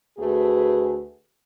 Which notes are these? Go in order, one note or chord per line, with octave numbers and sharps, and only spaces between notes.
D2 A3 F#4 G#4 B4